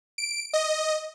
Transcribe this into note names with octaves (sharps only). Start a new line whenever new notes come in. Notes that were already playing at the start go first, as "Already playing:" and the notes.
D7
D#5